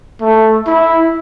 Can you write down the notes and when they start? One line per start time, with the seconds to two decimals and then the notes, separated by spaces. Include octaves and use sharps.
0.21 A3
0.67 E4